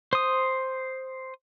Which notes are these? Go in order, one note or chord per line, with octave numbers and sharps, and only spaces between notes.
C5 D#6